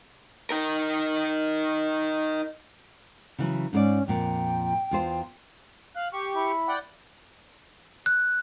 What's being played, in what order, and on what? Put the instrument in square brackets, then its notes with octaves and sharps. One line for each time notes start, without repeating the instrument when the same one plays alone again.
[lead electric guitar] D#4 A#4
[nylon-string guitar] C#3 E3 F#3
[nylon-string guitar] G#2 A#4 D5 [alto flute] C#4
[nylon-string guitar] F2 A#2 [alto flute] G5
[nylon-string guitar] E2 F4 C5
[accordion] F5 F#6
G4 C#6
[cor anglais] E4
[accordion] D5 F#5 G5
[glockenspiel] F#6